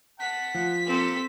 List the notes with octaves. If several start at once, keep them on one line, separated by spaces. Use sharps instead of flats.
F#5 A5 B6
F3
A#3 C4 G4 A4